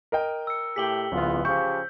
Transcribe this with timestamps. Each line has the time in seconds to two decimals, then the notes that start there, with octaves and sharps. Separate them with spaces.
0.12 A#4 D#5 G5
0.47 E6 C#7
0.76 A2 G4 B6 F#7 G7
1.12 D1 E2 B3 F4
1.45 C#3 F3 G4 C#6 G6